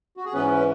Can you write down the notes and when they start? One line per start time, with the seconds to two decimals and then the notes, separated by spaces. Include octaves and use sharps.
0.17 F#4
0.25 G#4
0.33 G#2 E3 B3 C#4 B4
0.54 B4